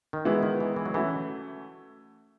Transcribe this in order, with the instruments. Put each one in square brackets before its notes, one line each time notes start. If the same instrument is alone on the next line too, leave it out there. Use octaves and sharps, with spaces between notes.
[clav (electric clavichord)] D#3
[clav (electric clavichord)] E3 [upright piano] G#3 B3 E4 B4
[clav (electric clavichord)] D#3
E3
E3
F#3
[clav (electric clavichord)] E3 [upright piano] A3 C#4 F#4